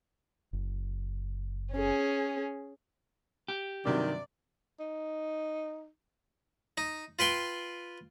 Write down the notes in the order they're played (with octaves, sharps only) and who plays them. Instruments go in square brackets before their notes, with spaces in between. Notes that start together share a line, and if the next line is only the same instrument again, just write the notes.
[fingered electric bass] F#1
[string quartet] C#4 G#4
[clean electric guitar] G4
[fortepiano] G2 C3 F#3 [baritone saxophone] D#3 [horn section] D5
[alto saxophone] D#4
[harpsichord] D#4
F4 B4 G5 C6